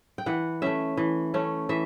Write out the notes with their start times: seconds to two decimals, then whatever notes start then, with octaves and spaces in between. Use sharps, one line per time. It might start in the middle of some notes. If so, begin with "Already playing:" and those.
0.18 G5
0.26 E3 F#5
0.62 A3 C#4 E5
0.97 E3
1.34 A3 C#4
1.69 E3 E5